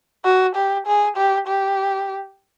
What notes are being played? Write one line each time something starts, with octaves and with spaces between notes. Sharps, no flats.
F#4
G4
G#4
G4
G4